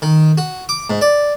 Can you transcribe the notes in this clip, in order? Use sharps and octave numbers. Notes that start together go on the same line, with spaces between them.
D#3
F#4
D6
G#2
D5